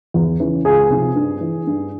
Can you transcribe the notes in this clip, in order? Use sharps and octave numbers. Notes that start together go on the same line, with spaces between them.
E2
C#3 E3
C#2 G#4
C3 F3
G2
E3
G2